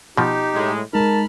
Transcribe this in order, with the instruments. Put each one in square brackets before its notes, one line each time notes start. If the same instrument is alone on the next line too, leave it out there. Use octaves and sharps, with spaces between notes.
[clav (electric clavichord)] B2 F3 [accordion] D#4 G4
[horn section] A2 G#3
[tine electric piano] G#3 D#4 [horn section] A#4 A5 [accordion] B5 F6